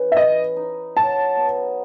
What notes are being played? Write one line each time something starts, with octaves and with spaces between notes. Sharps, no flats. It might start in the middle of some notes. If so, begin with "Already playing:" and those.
Already playing: C#3 E3
E5
B4 D#5
D#4
F#3 A5
B3